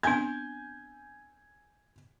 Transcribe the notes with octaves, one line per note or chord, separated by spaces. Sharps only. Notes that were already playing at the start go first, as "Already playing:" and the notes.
B3 C4 D4 G#5 G6 G#6